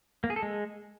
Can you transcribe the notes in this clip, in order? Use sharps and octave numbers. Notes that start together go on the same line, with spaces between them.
A#3
G#4
A4
G#3